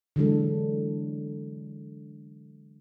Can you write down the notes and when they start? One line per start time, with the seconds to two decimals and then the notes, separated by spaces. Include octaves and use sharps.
0.16 D3 E3 F#3 G#3 D4 A4